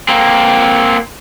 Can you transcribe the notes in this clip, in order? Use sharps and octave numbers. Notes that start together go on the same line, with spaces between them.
A#3 C4